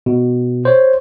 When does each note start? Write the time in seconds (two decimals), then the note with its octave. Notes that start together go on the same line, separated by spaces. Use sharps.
0.06 B2
0.65 C5 C#5